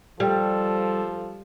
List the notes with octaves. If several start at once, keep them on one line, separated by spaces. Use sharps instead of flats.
F3 G3 A4